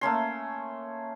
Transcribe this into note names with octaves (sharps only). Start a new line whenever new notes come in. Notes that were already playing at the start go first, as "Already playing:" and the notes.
A3 A#3 C#4 C6